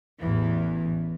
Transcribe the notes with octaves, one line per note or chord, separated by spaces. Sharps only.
A1 E2 E3